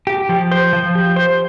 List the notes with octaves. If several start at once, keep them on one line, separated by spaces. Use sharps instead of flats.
G4
F3
C5
F3
G4
C5